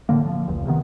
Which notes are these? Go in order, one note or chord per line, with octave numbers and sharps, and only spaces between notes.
A2 D3 A#3
F3
F1 C#2
C3 D#3 B3